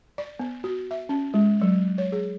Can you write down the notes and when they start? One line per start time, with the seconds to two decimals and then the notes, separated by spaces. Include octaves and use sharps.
0.18 D5
0.39 B3
0.64 F#4
0.91 E5
1.09 C#4
1.34 G#3
1.62 F#3
1.98 C#5
2.12 G#4